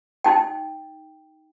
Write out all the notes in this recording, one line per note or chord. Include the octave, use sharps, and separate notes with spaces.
D#4 G5